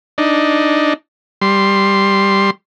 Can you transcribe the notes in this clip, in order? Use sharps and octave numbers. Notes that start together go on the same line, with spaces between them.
D4 D#4
G3 C6